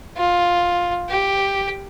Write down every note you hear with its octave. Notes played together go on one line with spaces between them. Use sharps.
F4
G4